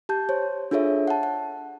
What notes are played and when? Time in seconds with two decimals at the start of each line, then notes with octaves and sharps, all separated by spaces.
0.09 G4 A5 G6
0.29 C5 C#5
0.71 D4 F4 G#4 A4 C#5 E5
1.08 F#5 A5
1.23 F#5